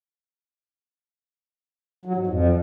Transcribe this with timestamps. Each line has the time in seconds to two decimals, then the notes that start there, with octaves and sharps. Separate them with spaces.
2.05 F#3
2.16 G#2
2.27 F2